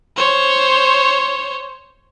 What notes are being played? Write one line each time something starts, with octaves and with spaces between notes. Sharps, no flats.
C5 C#5